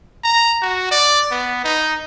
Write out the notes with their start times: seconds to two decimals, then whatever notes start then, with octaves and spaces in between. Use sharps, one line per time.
0.24 A#5
0.62 F#4
0.91 D5
1.31 B3
1.64 D#4